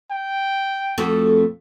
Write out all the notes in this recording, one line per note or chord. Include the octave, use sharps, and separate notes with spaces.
G5
F2 A3 F#4